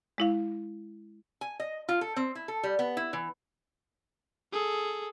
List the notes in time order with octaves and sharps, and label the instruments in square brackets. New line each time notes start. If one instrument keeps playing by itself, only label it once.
[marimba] G#3 E4 F5
[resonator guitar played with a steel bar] G#5
D#5
F4
A4
C4
E4
A4
G3
B3
E4
E3
[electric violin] G#4 A4